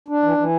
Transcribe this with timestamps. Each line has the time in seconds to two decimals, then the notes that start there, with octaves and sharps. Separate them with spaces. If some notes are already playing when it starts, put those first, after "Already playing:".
0.08 D4
0.23 E3
0.37 E3